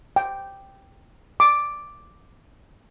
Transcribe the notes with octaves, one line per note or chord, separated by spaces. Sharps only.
G5
D6